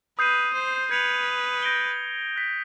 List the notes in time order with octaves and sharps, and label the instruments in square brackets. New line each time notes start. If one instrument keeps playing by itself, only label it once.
[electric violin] B4 [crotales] D#6 G6 C7 D#7
[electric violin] C5
[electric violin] B4 [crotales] G#6 C#7 F7
[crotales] G6 A#6 D7 G7
F#6 B6 D7